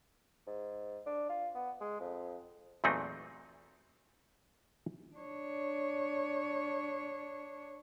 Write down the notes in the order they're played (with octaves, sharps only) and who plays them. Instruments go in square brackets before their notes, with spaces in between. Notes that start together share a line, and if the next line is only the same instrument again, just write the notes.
[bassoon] G#2
D4
F4
B3
G#3
F2
[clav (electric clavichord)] E2 A#2 F#3 A3 C4 D#4
[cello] D4 C#5